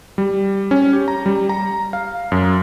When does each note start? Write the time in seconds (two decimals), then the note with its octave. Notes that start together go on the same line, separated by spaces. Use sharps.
0.18 G3
0.71 C#4
0.93 G4
1.08 A#5
1.26 G3
1.49 A#5
1.93 F5
2.32 F#2